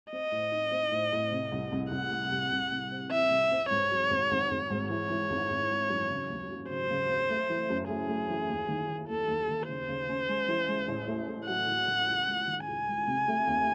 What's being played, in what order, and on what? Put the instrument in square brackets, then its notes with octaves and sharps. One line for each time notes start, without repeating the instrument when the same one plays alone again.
[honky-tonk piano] C4 [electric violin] D#5
[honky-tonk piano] A2
D#4
C4
A2
A2
C3
C2
C2
[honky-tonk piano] C2 [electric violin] F#5
[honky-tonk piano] C3
C2
C2
C3
C4
[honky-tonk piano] E3 [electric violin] E5
[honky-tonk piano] C3
C4
[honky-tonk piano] G#2 [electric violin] C#5
[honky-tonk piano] F#3
G#1
G#1
G#1
G#2
[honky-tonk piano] E3 [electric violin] C#5
[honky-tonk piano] E3
G#1
G#1
G#3
F#2
C#3
D#2
F#3
[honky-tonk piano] C#3 [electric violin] C5
[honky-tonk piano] C#3
C4
A3
E3
F#2
[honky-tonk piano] A3 [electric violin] G#4
[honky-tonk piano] A3
E3
D#2
D#3
D#3
[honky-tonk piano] D#2 [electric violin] A4
[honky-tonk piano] D#2
D#3
[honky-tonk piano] C#3 [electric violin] C5
[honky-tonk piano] C#3
C#4
G#3
E3
G#3
A1
A3
A3
[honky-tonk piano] F#3 [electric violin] F#5
[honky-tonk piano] A1
A1
C#2
G#3
D#3
[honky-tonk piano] C#2 [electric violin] G#5
[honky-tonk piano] G#3
C3
A3
D#2